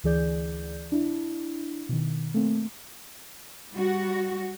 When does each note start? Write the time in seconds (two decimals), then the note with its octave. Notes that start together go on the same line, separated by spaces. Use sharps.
0.04 D2 E3 G#4 D5 G6
0.92 D4 E4
1.89 B2 D#3
2.34 A3 A#3 C4
3.73 G3 F#4